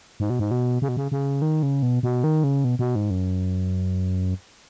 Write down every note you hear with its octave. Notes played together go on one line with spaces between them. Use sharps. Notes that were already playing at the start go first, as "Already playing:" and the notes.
G#2
B2
G#2
B2
C#3
B2
C#3
C#3
D#3
C#3
B2
B2
D#3
C#3
B2
B2
G#2
F#2